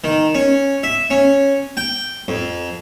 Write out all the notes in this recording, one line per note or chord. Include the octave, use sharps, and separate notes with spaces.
D#3
C#4
E5
C#4
G5
F2